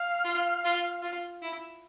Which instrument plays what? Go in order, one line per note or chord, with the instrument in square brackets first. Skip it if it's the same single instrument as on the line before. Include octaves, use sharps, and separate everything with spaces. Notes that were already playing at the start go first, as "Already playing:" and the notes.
Already playing: [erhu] F5
[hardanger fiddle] F4
F4
F4
E4